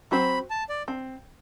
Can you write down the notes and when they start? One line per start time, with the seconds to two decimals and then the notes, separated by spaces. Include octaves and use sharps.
0.11 F#3 C4 F#4 C5 B5
0.50 A5
0.69 D5
0.88 C4